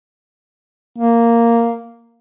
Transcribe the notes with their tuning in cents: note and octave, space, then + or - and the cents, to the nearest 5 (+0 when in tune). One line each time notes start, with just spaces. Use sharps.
A#3 -5